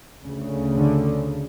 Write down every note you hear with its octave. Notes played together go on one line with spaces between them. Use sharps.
D2 C#3
D3